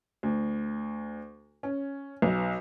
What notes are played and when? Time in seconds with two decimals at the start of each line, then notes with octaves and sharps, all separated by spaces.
0.23 D2
1.63 C#4
2.22 B1